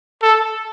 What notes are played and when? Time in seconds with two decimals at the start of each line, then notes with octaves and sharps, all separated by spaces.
0.22 A4